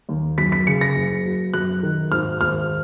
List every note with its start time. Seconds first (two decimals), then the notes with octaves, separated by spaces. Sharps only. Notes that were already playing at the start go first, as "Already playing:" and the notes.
0.09 D#2
0.38 F#2 B6
0.52 B6
0.67 C#3 C#7
0.81 A#6
0.96 F#1
1.25 F#3
1.54 F#2 F#6
1.83 D#3
2.12 G#1 F6
2.41 G#1 F6